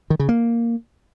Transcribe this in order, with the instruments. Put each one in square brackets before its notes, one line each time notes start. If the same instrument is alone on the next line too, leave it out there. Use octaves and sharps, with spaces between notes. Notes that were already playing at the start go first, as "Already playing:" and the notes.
[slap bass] D#3
C#3
A#3